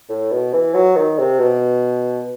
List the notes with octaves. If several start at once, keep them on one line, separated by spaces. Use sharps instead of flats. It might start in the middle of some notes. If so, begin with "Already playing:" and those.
A2
B2
E3
F#3
D#3
C3
B2